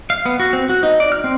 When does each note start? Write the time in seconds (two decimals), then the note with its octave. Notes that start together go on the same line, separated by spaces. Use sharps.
0.10 F5
0.26 B3
0.40 F#4
0.53 C4
0.70 F#4
0.83 D#4
1.00 D5
1.12 F6
1.24 C4